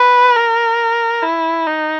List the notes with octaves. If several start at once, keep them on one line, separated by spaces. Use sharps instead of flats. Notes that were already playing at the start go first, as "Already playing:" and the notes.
Already playing: B4
A#4
E4
D#4